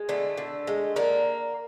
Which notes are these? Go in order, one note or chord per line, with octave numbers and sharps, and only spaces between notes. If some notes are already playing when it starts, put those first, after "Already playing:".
Already playing: G#3
D3 A3
D3
G#3
D3 A#3